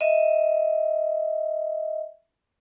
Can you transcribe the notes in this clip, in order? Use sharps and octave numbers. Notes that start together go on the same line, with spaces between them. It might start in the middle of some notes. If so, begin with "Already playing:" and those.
D#5 E5